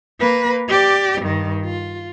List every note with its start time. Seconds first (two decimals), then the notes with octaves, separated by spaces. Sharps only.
0.19 A#3 B4
0.68 G4 D5
1.21 G2 D#3
1.65 F4